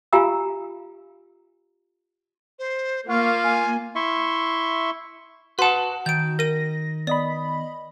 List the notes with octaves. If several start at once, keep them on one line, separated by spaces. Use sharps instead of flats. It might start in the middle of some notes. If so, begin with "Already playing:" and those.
F4 G4 F5 G#5 A#5 E6
C5
A#3 F4 F5 C#6
G#5
E4 E5 C6 C#6
F#4 B4 F#5 A5 C6
D#3 G6 D7
A#4 A#6 D#7
B3 D5 D#5 B5